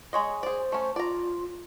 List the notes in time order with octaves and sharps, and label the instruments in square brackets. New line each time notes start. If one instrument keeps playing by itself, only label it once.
[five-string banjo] G#3 C#5 D#5
[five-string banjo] G#4 D5 [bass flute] C5
[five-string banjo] A3 C#4
[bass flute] F4 [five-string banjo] D5 A#5